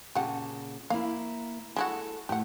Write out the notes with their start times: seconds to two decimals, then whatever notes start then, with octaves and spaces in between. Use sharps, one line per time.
0.15 A#2 C#3 G4 F#5 A5
0.90 A#3 E4 F5
1.76 G#3 E4 F#4 A4
2.29 A2 G4 F#5